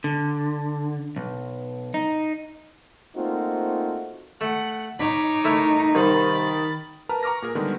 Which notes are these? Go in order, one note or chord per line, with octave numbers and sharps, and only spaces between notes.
D3
B1
D#4
A3 A#3 C4 D#4 F4 F#4
A3 F#5
D#4 C#5 B5 D6
A3 E4 A#4
C2 D#3 B5 A6
A#4 B4 A5 A#5 F6
A#5 C#6 D6 F6 A#6
A#2 G#4 A#4
D3 D#3 G3 G#3 B3 F#4